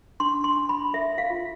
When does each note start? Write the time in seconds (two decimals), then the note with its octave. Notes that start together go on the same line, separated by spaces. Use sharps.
0.20 D4 C6
0.44 C6
0.57 D4
0.69 B5
0.93 A4 E5
1.18 F5
1.30 F4